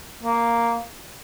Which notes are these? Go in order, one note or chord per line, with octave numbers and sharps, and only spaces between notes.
A#3